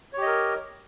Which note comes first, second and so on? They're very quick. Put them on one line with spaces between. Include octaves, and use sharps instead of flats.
C#5 G4 D#5 A#4